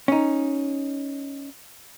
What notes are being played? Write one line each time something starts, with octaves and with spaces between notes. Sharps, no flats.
C#4 D#4